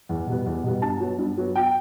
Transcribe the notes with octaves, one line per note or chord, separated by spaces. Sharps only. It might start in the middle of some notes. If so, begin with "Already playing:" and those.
E2
B2 G3 B3
E2
B2 G3 B3
G2 A5
F#3 B3
G2
F#3 B3
G5